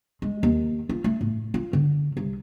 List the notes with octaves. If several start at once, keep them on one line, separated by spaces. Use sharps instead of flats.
G#3
D#2
F4
A3
A2
F4
D3
C2